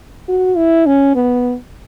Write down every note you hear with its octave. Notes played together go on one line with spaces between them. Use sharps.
F#4
E4
C#4
B3